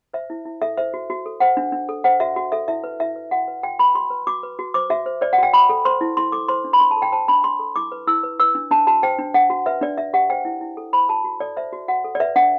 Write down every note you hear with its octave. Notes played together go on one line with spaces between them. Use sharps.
C5 E5
E4
E4
A4 E5
C5 E5
F#4
F#4
A4
C5 F#5
D4
D4
A4
C5 F#5
F#4 E5
F#4
A4 E5
E4 E5
B4
E4 E5
B4
F#4 F#5
B4
F#4 G5
B4 B5
F#4 C6
B4
F#4 D6
B4
F#4
C5 D6
F#4 E5
C5
C5 D5
F#5
F#4 G5
F#4 B5
A4
C5 C6
E4
E4 C6
A4 D6
C5 C6
D4
B5
D4 C6
A5
A4
G5
C5 A5
D4 B5
D4 C6
A4
E4 D6
B4
E4 E6
B4
B4 E6
D4
D4 A5
F#4 A5
C5 G5
D4
D4 F#5
F#4
B4 E5
D4 D5
D4 E5
G4 F#5
C5 G5
E4
E4
A4
C5 B5
F#4 A5
F#4
A4 D5
C5 E5
F#4
F#4 F#5
A4
D5
B4 E5
D4 F#5